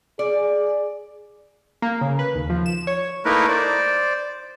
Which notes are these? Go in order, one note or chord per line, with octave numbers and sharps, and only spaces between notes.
G#4 D5
A#3
C#3
B4
D#2
F3
E7
C#5
A3 A#3 D#4 E4 A#4 B4
C5 D5